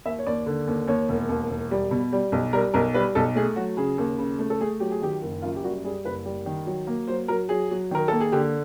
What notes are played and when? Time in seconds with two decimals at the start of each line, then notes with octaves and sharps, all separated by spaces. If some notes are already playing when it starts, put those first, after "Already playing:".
0.05 D#2 E5
0.19 C#5
0.27 D#2 D5
0.46 D3
0.67 D#2
0.87 D#2 C#5
1.09 E1
1.29 D#2
1.50 E1
1.71 G3
1.91 B2
2.12 G3
2.32 B1
2.53 G3 A#4
2.74 B1 A#4
2.94 G3 B4
3.15 B1 A4
3.35 A3 G#4
3.56 F#3 F#4
3.77 C#3 G#4
3.98 D#2
4.18 C#3
4.39 A3
4.50 A4
4.61 A3 G#4
4.80 F#3 G4
4.91 G#4
5.02 D#3 G4
5.22 F#1
5.42 F#2 F4
5.56 G4
5.63 G3 F#4
5.84 G3 G#4
6.04 F#1 B4
6.25 G3
6.46 D#3
6.67 F#3
6.87 A#3
7.08 F#3 C5
7.28 F#3 A#4
7.49 F#3 G#4
7.71 F#3
7.91 D#3 A#4
8.08 A#3 A4
8.20 G#4
8.32 D3 G4